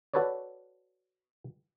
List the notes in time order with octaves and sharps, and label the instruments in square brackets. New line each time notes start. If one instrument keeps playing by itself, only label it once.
[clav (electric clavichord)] F#4 A4 B4 C#5 D5